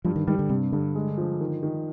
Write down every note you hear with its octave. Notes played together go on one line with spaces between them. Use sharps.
G2 F3
D#3
D#3 G3
D3
G2 C3
G2 D3
G#3
F3
D#3
D#3